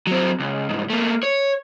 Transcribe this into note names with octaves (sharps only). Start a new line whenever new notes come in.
F#3 C4
C#2
C2 G#2
A3 A#3
C#5